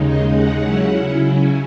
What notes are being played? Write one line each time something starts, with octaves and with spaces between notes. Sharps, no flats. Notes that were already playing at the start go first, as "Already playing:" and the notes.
Already playing: D#2 C#3 G#3 D#4
D#5
F#5
C#3 F#3 C#4 E4